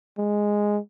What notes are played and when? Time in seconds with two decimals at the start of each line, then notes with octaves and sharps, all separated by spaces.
0.18 G#3